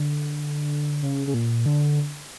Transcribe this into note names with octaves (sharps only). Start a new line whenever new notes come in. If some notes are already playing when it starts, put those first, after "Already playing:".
Already playing: D3
C#3
C#3
A#2
D3